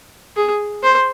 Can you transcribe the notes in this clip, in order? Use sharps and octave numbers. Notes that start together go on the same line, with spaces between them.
G#4
C5